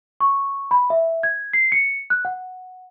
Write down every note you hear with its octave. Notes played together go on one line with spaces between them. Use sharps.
C#6
B5
E5
G#6
C7
C#7
F#6
F#5